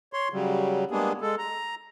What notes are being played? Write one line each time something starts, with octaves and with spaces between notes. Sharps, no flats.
C#5 C6
C#3 F#3 G3
G3 G#3 A#3 B3 D4 G#4
G#3 A4
A#5